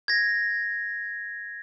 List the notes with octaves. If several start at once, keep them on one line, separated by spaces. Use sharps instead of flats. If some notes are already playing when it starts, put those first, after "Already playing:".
G#6 A#6